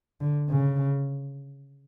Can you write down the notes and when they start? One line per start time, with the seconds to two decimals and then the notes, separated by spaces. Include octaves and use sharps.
0.21 D3
0.49 C#3